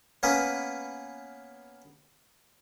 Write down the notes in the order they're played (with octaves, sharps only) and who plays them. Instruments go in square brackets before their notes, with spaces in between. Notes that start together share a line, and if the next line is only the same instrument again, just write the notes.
[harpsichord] A#3 B3 C#4 B4